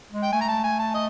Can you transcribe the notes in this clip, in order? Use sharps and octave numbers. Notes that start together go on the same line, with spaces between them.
G#3
G5
A3 G#5
A#5
A5
G#5
A5
D#5